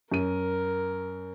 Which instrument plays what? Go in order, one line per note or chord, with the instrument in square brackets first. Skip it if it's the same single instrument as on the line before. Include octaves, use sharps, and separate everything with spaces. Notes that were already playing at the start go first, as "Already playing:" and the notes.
[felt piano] F#2 D#7 [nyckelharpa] A#4